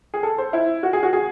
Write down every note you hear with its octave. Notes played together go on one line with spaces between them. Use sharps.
G#4
A4
C5
E4
F#4
G#4
F#4
G#4